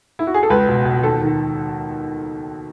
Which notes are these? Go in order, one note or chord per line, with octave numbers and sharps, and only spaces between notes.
E4
F#4
G#4
A4
C#2 B4
B2
B2
D#2 A4
D#3